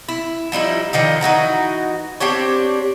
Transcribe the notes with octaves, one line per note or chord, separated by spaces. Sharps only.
E4
F3 G3 D#4 E4
D3 D#3 F3 D#4
E3 D#4 F#4 A#5
C4 D4 G4 C#5